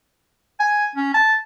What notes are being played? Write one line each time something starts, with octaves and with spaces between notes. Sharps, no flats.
G#5
C#4
A5